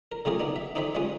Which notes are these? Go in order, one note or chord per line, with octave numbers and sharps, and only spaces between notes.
A#4
C#3 A3 F4 G4 G#4 A#4
B3 D4 D#4
E5
D4 D#4 A4 C5 E5 G5
G3 G#3 C#4 F4 B4 D#6